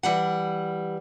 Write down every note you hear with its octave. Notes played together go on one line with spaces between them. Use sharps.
E3 G3 F#5